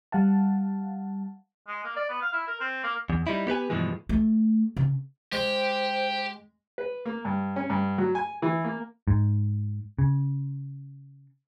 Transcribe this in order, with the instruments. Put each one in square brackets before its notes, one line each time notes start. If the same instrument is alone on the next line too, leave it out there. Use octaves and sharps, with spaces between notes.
[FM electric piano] G3 F5 F#5 A5
[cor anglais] G#3
A#3
D5
B3
F5
E4
A#4
C4
A#3
[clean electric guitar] E2
G3 D#4 E4
B3 G4 B4 G#5
G2 B2 E3 F3 G#3
[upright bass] A3
C#3
[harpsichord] G#3 [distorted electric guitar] G4 [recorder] C5
[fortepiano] B4
A#3
G2
C#4
G2
F#3
G#5
E3
A#3
[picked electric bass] G#2
C#3